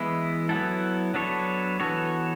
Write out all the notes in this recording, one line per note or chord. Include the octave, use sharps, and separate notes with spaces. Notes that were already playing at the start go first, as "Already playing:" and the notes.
Already playing: E3 G#3 B3 E4
F#3 B3 E4 A4
F#3 B3 D4 A4 C#5
E3 B3 F#4 A4 C#5